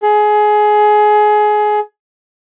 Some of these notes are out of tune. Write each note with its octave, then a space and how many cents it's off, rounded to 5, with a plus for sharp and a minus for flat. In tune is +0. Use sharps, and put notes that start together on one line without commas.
G#4 +20